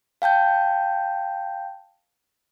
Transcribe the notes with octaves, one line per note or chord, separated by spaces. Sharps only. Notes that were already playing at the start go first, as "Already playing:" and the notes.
F5 G5 A5 G6